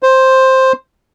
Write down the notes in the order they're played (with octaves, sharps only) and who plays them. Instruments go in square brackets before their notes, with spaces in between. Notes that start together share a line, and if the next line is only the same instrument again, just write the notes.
[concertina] C5